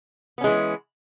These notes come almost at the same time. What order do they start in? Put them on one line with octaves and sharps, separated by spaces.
B3 C#4 G#3 E3